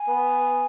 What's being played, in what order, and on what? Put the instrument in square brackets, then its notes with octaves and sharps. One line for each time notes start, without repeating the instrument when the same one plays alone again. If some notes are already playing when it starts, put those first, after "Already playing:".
Already playing: [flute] G#5
[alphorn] B3